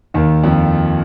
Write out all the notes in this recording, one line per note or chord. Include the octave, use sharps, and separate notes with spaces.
D#2 D#3
F2 F3